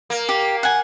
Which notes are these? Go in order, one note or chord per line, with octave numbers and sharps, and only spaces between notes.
A#3
G4
F#5 G#5